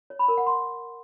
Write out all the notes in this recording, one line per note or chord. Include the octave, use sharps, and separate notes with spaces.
C#5
B5
A#4
F#5
C6